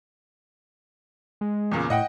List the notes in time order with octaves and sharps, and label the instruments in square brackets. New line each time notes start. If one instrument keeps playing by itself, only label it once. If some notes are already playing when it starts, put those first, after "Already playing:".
[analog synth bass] G#3
[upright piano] E2 A#2 C#3
[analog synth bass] A2 [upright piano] D#5 F#5 G5